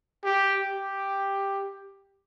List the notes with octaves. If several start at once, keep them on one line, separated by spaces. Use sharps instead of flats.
G4
G4